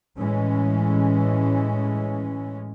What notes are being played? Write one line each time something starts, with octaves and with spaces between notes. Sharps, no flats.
A2 E3 G#3 C#4